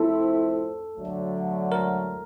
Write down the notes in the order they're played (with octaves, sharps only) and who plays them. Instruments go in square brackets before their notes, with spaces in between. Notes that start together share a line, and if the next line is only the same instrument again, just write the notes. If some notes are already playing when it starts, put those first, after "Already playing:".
Already playing: [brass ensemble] F3 A3 C4 E4 [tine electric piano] A4
[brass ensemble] D3 F#3 A3
[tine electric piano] A#4